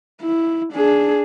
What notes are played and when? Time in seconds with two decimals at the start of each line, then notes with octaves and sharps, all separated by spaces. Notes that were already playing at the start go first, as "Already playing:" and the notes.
0.22 E4
0.73 D4 G#4